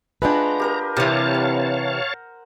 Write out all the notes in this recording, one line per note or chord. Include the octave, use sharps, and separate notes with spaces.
G#3 D4 F4 B4 F#5 G5 A#5
G4 A#4 D#5
C3 E3 G3 C5 C#5 F5 A5 A#5
F#5